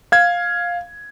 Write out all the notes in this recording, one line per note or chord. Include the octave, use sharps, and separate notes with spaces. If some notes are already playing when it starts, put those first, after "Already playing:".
F5 G#6